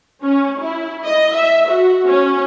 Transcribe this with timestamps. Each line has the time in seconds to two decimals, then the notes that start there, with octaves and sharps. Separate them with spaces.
0.22 C#4
0.60 E4
1.05 D#5
1.35 E5
1.69 F#4
2.07 C#4